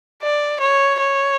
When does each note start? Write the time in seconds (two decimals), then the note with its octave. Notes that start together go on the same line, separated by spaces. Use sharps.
0.22 D5
0.61 C#5
1.00 C#5